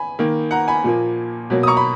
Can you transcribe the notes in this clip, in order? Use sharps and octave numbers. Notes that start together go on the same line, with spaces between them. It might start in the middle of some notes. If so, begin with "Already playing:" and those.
Already playing: G#5 B5
D#3 A#3
F#5 A#5
G#5 B5
A#2 F3 A#3
B2 F#3 A#3
D#6
A#5 C#6
B5